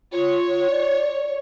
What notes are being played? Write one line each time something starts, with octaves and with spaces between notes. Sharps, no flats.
F4 C#5
D5